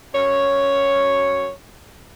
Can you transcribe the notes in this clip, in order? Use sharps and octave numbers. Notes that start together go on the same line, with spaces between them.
F#2 C#5